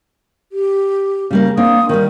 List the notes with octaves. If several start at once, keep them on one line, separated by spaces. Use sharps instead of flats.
G4
C#3 G3 A#3
A#3 C4 D4 D#6
D#3 G3 A#4